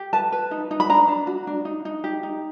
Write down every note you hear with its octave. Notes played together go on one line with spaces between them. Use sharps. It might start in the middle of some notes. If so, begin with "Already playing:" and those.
Already playing: G4
B4 A5
B4
D#4
D#4
B5
D4 A#5
D4
F#4
D4
D#4
D#4
G4
D#4